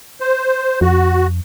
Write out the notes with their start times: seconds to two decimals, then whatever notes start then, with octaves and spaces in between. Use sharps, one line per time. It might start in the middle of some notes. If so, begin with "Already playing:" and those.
0.20 C5
0.81 F2 F#4